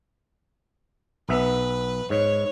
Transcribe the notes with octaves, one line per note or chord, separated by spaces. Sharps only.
B1 B3 B4 E5
G#2 C#5